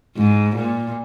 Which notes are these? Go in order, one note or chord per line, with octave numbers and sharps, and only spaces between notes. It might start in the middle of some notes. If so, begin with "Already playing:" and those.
G#2
A#2